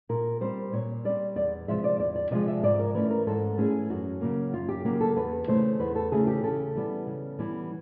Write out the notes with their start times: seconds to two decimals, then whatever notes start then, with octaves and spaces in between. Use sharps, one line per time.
0.09 A#2 A#4
0.41 G3 C4 C5
0.73 A#2 C#5
1.05 G3 C4 D5
1.36 E2 D5
1.68 C3 F3 G#3 E5
1.84 D5
1.99 E2 D5
2.16 D5
2.31 C3 F3 G#3 D#5
2.47 E5
2.63 G#2 D5
2.79 A#4
2.95 E3 A3 C#4 B4
3.10 A#4
3.27 G#2 A4
3.58 E3 A3 C#4 G#4
3.90 F#2 F#4
4.21 C#3 F#3 A#3
4.53 F#2 F4
4.69 G4
4.85 C#3 F#3 A#3 G4
5.01 A4
5.16 E2 B4
5.48 C#3 E3 A3 C5
5.80 E2 B4
5.96 A4
6.12 C#3 E3 A3 G#4
6.27 G4
6.43 C#3 A4
6.75 E3 G3 B3
7.07 C#3
7.39 E3 G3 B3